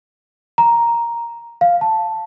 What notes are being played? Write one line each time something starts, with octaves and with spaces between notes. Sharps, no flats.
A#5
F5
A5